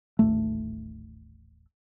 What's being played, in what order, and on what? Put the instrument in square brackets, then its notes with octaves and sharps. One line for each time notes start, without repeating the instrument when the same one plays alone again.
[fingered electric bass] D#1 A1 A3